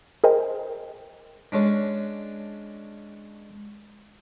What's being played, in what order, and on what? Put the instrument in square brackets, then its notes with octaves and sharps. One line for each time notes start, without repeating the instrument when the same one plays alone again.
[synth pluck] G#4 A#4 C5 D#5 G5
[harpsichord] G#3 C#4 D4